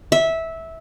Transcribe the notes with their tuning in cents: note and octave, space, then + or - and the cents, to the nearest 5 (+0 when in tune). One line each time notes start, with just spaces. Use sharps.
E5 -15